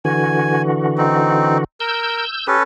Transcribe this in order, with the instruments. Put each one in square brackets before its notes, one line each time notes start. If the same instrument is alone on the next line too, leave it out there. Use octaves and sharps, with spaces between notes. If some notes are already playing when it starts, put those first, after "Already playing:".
[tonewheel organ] D3 E3 F#4 [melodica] G#5
[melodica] C4 D#4
[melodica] A#4 [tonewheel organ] E6 G6
[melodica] C#4 A4 B4 [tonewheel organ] G4